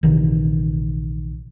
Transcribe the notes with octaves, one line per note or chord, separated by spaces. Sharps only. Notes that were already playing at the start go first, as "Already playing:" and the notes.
A#1 C3 D#3 E3